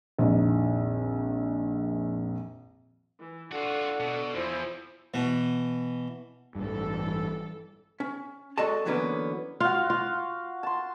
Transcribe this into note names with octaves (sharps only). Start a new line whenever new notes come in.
A#1 F2 D#3
E3
D4 F4 F#4 A4 F#5
B2
E2 F3 E4 C5
B2 E3
A1 G2 E3 G3 A4
C#4
G#3 F#4 A4 D5 D#5 A5
D3 E3 F#3 A#3 B3 C#4
F4 F#4 F5
F4
A5 C6